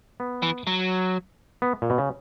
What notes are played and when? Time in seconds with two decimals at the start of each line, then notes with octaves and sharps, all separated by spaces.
0.20 B3
0.43 E3
0.67 F#3
1.62 B3
1.82 A#2
1.90 B2
1.98 C#3